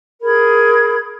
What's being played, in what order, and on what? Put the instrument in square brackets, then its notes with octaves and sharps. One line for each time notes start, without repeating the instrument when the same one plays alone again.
[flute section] G#4 A#4 B5 G#6